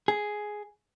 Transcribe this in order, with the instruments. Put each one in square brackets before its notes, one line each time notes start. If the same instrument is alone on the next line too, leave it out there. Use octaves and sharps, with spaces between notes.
[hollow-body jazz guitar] G#4